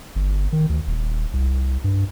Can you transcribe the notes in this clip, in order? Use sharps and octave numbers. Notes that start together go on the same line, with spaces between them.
G1
D#3
D2
D#1
C2
G2